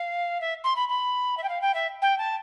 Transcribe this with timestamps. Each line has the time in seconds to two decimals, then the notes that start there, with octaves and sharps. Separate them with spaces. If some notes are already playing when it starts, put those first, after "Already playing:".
Already playing: F5
0.41 E5
0.64 C6
0.76 B5
0.89 B5
1.37 E5
1.44 G5
1.49 F5
1.62 G5
1.74 E5
2.02 G5
2.18 A5